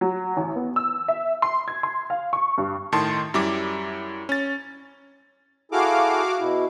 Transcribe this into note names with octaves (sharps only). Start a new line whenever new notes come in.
F#3
A1
B3
E6
E5
C6
G#6
C6
F5
C#6
G2
A2 D#3 A5 C6
F#2 G3 E4 D6
C#4 A6
E4 F#4 G#4 A4 F5 D6
B2 E4